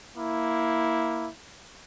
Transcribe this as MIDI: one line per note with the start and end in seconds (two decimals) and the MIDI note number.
0.18 1.29 58
0.18 1.29 64